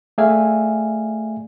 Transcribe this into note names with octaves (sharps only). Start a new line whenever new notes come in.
A3 G#4 D5 E5 F5 G#5